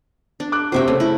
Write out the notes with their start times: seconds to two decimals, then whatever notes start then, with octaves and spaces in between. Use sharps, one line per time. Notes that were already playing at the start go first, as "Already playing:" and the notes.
0.40 D4
0.52 D6 F#6
0.72 C3 F#4 C5 E5 G5
0.88 C#3 A3
1.00 E4